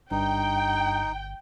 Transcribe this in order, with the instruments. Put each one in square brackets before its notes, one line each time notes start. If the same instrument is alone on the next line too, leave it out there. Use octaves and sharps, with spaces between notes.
[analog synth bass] G1 [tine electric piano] G2 [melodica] D#4 [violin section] G5